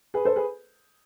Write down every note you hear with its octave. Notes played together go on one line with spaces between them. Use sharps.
G#4 B4
A4 C5
G#4 B4